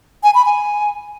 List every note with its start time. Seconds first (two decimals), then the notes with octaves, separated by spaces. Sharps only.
0.23 G#5
0.34 B5
0.45 G#5